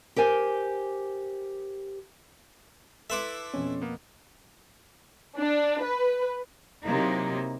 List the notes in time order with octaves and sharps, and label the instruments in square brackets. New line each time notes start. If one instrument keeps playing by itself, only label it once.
[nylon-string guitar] G4 A#4 C5 G#5
[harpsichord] E4 B4 E5 [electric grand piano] A4 C6 D6
[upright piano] F2 B2 C4 [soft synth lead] C#4
[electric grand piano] A#3 B3
[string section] D4
B4
[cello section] C3 F#3 A#3 D#4 E4